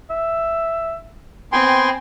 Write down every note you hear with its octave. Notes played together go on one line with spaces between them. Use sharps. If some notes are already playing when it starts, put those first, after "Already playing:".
E5
B3 C4 G5 G#5 C6